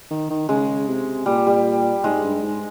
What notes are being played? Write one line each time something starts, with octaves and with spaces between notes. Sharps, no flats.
D#3
D#3
C#3 G#3
C3
A#2 G3
G3
G#2 G#3
G2
G#2